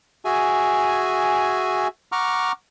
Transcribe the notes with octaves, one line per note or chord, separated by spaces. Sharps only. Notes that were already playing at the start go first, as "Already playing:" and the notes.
F#4 G#4 E5 G#5
F#5 A#5 C#6 D6 F6